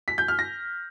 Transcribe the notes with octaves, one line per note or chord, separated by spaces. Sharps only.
B6
G6
F6
A#6